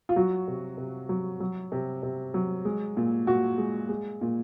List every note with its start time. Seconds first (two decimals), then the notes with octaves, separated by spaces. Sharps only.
0.09 F4
0.16 F#3 F#4
0.48 C3
0.77 C3
1.09 F#3
1.40 F#3
1.72 C3
2.03 C3
2.34 F#3
2.65 G#3
2.97 A#2
3.27 A#2 F#4
3.58 G#3
3.89 G#3
4.21 A#2